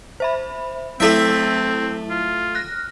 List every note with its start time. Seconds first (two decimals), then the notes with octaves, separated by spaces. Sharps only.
0.20 C5 E5 B5
1.00 F#3 A3 C4 E4 A4 E5
2.10 F4
2.55 F6 F#6 A#6